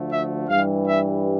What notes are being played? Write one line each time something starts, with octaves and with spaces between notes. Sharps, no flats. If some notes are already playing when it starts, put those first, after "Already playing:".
Already playing: D2 D3 F3 A3
E5
G2 E3 G3 F5
E5